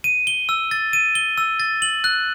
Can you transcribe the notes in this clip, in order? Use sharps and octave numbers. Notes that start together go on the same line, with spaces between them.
D#7
G7
E6
A6
D#7
G7
E6
A6
F#7
F#6